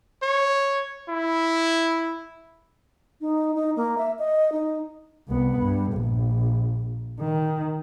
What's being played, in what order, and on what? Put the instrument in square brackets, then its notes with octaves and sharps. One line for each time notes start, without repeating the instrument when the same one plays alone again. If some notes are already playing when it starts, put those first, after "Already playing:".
[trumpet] C#5
E4
[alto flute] D#4
D#4
A#3
E5
D#5
D#4
[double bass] C2 B3
G2
A#1
D#3